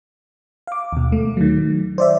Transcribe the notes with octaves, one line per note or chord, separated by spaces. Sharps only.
F5 D6
D#2 B2
A3
D#3 F#3
C5 D5 E5